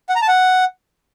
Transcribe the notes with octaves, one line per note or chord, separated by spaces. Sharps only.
F#5
A#5
A5
F#5